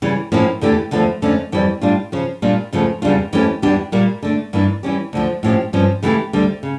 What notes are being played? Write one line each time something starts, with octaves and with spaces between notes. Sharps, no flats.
C#3 E3 G3 C#4
A2 F3 A#3 C#4 E4
E2 D3 A3 E4 G4
E2 D3 F3 A3
F2 D3 A3 C#4
F2 E3 G3
A2 G3 D4 F4
C#3 F3 C#4
A#2 G3 A#3 D4 F4
E2 C#3 F3 A3
E2 C#3 G3 D4 F4
F2 E3 A3 C#4 G4
E2 E3 G3 D4 G4
A#2 G3 A#3
D3 A3 D4
G2 E3 A#3 D4
E3 G3 C#4 G4
D2 D3 F3
A2 F3 C#4 G4
G2 F3 C#4
C#3 E3 A3 E4 G4
D2 D3 G3
C#3